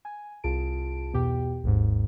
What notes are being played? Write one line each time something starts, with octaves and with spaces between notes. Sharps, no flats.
G#5
C2 F4 G#4 A5 D7
E2 B2 G4 G5
G#1 D#2 G#2